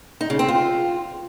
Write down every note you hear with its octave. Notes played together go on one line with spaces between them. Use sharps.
D#4
C#3
C4
F4